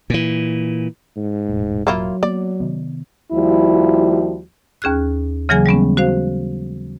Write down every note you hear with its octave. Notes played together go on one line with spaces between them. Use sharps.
A#2 E3
G#2
E1 A2
F#3 A#3 E4 F4
A#3 B3 D5
C3 D#3 B3
D#2 F3 G3 E4 F#4
D#2 C#4 G#4 F6 F#6
C#3 E3 F#3 A#3 G#4 G#5
G3 G#3 B3 C#4
F#4 C5 F5